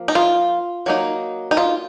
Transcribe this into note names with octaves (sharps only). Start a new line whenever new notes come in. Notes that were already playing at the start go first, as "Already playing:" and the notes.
Already playing: F3 A#3
D#4
F4
F#3 A#3 D#4
D#4
F4